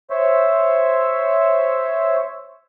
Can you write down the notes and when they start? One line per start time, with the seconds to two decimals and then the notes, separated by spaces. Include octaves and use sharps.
0.10 C5 C#5 E5